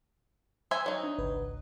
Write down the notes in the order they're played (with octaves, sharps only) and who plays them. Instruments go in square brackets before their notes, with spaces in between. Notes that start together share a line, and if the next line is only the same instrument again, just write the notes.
[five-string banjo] C5 E5 G#5
F#3 D#4
[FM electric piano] D4
G#1 C#2 B4